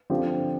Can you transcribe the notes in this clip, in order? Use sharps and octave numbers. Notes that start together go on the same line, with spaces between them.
D3 F3 C4 G4